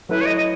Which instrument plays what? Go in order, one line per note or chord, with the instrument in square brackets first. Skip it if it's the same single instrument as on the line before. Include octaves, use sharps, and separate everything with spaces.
[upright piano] F#3 A3 E4 [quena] B4
[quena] C#5
D#5
D#5